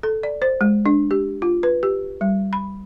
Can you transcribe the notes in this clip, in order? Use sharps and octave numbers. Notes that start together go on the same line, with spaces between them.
A4
D5
C5
G#3
D4
G4
F4
B4
G4
G3
B5